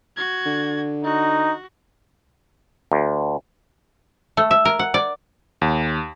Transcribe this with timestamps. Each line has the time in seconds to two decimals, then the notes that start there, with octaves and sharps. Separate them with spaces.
0.16 F#4 G#6
0.46 D3
1.04 D#4 F#4
2.92 D2
4.37 A3
4.51 E5
4.65 A#4
4.79 F#5
4.94 D5
5.61 D#2